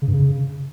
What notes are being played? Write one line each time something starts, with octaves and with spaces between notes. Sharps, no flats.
C#3
G2
C#3